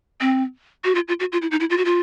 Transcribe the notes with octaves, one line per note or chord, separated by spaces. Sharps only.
C4
F#4
F4
F4
F#4
F4
E4
D#4
E4
F4
F#4
F4